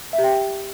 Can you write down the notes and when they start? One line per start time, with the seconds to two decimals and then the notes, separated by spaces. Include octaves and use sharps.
0.13 E5
0.18 G4
0.24 G5